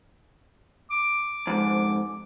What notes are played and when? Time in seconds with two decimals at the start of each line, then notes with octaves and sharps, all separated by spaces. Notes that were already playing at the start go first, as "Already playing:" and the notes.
0.91 D6
1.47 F2 G#2